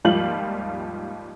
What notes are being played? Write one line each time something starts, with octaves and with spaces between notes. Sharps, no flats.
D#2 G#2 F3 G3 F4 F#7